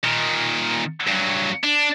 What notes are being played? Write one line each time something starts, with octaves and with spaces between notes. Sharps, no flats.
A#2 D#3
G2 F#3
D4